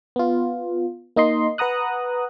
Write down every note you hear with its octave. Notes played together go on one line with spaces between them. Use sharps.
B3 F4
A#3 D#4 D#5 C6
B4 F#5 A#5 D#6 F#6